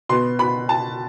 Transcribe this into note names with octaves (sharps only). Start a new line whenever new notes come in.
B2 B3 C6
B5
A5